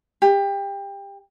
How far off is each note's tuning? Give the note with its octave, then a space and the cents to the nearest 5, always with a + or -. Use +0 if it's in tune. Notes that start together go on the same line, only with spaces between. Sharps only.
G4 +25